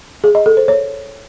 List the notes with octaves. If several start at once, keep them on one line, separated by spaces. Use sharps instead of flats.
G#4
D#5
A4
C5
C#5